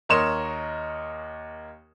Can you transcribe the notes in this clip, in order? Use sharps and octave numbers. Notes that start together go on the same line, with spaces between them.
D#2 A#4 C#5 D#5 C6 E7